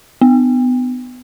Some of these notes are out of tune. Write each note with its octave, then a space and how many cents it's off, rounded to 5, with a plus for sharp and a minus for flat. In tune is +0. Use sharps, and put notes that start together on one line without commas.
B3 +25